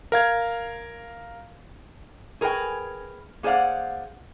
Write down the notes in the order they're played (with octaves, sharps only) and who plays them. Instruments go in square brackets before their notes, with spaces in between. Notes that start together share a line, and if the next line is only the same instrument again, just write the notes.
[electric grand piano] A#4 F5 G#6
[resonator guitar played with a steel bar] G#4 A#4 B4 C#5 G5 G#5
A#3 G#4 C5 D5 F5 F#5